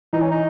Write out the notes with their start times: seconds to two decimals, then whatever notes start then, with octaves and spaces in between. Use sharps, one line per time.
0.13 E3 D#4
0.22 C#4
0.31 D#4